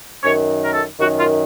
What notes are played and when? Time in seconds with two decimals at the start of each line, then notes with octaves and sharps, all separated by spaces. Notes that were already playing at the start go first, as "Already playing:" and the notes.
0.23 F#2 D#3 C#5
0.64 A#4
0.73 A4
0.99 F#2 D#3 F#4
1.18 F4